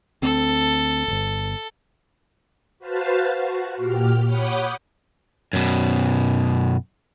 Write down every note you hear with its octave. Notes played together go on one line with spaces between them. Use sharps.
D2 C4 A4
D1 G1
F#4 B4 C5 F5 A5
F#4
A#2 G4 F6
C#5 F#5 B5 D6 D#6 G6
F#2 B2